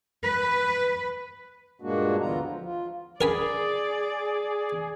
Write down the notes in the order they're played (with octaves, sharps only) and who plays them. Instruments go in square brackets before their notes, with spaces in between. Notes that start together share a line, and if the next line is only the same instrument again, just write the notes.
[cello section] B4
[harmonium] G2 A#2 G#3 A#3 D4 F#4
D2 D3 E3 B3 F4 A#5
F3
F4
[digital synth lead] G#4 [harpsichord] A#4 G#5 B5 [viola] D5